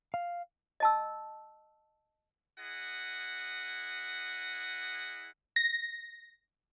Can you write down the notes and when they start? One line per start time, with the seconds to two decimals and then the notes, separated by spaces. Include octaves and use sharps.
0.14 F5
0.80 D#5 A5 E6
2.58 E4 G#4 D#5 F#5
5.56 A#6